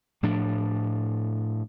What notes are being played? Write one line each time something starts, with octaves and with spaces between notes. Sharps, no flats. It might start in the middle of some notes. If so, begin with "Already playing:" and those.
A2 F3 D4